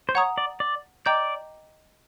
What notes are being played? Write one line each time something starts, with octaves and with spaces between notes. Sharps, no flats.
C5
C#5 F#5 A#5 D#6
D5
D5
D5 D#5 G5 A#5 D6 G6